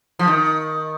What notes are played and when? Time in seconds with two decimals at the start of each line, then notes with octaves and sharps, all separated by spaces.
0.19 F3
0.28 D#3